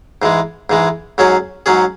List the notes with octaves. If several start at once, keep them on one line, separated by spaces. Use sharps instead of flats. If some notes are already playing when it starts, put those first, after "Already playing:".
G#2 E3 G#3
G#2 E3 G#3
G#2 F#3 C#4 G#4
G#2 F#3 C#4 G#4